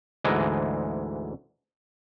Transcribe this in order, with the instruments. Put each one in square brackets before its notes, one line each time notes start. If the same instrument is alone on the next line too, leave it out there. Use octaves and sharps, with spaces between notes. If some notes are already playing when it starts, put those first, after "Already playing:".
[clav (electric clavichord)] D2 G#2 E3 G#3 D5 D#5